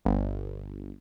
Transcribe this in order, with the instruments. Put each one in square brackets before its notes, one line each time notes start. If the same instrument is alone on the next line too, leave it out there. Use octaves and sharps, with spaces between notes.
[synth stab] G1